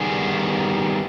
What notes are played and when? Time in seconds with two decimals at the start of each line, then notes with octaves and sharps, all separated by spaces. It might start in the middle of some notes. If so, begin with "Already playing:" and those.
Already playing: D#3 G3 B3 G#4